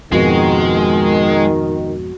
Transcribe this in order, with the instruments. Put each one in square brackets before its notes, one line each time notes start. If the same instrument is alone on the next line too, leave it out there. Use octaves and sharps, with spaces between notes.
[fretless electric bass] F2 G#2 B2 [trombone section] D#3 [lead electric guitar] G#3 [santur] F#4